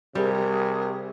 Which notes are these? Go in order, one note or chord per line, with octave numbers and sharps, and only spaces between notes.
C3 G3 G#4 A#4